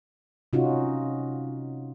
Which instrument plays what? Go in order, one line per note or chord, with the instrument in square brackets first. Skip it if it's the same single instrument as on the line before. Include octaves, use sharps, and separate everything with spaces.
[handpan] C3 C#4 D#4 F4 F#4